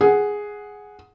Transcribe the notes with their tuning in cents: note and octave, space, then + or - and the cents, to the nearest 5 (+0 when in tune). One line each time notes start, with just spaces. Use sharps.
G#4 +0 F#5 +0